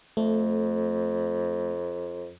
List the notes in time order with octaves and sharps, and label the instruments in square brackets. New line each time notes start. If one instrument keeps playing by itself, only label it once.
[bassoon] F2 [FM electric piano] A3